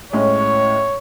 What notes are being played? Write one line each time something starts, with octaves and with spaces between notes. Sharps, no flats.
A2 G#3 C#4 C#5